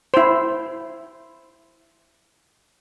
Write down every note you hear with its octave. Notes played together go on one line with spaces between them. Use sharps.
E4 C5